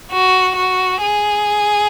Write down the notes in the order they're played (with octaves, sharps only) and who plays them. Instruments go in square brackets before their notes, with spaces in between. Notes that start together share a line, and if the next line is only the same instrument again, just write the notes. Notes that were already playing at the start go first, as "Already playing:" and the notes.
[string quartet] F#4
F#4
G#4